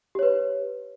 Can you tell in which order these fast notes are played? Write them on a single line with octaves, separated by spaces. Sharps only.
G4 C#5 B4